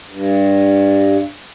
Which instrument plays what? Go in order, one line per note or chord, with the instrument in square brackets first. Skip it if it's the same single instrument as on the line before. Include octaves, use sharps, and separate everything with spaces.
[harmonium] G2